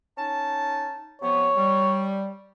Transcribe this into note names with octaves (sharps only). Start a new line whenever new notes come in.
C#4 D#4 A5
C3 F3 B3 C#5
G3